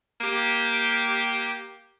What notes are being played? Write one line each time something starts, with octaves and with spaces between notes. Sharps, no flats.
A#3 G4